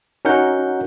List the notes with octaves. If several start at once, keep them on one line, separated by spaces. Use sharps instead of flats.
C#4 D#4 F#4 A#4 F#5 G6